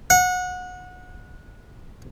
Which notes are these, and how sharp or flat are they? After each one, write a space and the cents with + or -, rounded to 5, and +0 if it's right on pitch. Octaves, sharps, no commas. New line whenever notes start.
F#5 -25